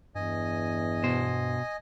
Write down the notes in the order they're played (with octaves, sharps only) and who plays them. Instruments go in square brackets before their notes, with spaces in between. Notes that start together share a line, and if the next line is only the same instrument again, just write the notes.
[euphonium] E2 [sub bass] G2 [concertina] D#5 G#5
[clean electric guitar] B2 C5